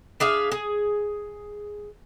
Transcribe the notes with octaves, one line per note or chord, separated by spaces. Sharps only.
D4 G#4 E5 F5
G#4